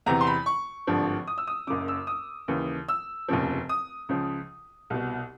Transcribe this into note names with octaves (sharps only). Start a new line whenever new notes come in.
E2 C3 E3 A#5
C6
B5
C#6
G#1 G2 D3 F3
D#6
E6
D#6
F#1 F#2 C#3 D6
E6
D#6
D#2 C#3 E3
E6
F1 D#2 C#3 F3
D#6
C#2 C#3 F3
C2 B2